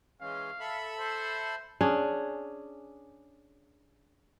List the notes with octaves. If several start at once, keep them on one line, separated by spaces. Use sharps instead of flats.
E3 G#3 C#4 F5
A4 E5 B5
C5
C#4 D4 G#4